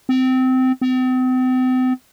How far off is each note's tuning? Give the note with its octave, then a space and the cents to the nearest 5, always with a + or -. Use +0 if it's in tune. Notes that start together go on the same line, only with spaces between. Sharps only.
C4 -20
C4 -40